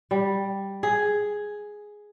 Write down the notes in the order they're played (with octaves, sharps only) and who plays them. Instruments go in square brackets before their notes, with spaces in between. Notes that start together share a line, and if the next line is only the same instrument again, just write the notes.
[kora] G3
G#4